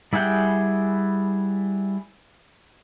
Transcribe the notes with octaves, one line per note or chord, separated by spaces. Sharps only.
G3 E4 G#4 F#5 G5